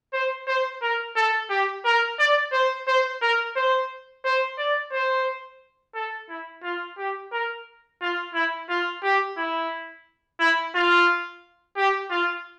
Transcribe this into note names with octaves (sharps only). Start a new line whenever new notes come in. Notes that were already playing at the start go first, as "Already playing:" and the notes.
C5
C5
A#4
A4
G4
A#4
D5
C5
C5
A#4
C5
C5
D5
C5
A4
E4
F4
G4
A#4
F4
E4
F4
G4
E4
E4
F4
G4
F4